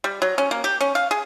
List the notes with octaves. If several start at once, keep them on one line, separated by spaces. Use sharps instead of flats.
G3
F#3
C#4
A#3
G4
C#4
F5
G#4